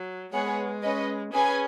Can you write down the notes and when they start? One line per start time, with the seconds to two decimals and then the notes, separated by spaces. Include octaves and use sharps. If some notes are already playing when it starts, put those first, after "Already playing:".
Already playing: F#3
0.33 G#3 B3 G#4 C#5 F#5
0.82 C#4 B4 D#5
1.33 C#4 G#4 B4 G#5